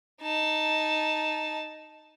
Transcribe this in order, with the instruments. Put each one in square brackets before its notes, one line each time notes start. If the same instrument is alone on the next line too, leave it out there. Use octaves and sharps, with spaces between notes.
[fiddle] D#4 A5